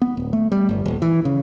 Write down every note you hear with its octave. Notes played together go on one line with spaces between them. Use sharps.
B3
D1
A3
G3
G1
D#1
E3
C#3